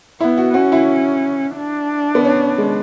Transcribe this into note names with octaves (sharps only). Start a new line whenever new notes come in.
B3 E4
F#4
C#4 F#4
E4
D4
B3
C#4
G#3